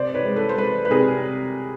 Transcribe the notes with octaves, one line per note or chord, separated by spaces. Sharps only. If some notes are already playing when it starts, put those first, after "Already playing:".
Already playing: C3 C5 D5
B4 C#5
G#3
A4 B4
C5
G#3 A4 B4
B4
C3 G#4 A#4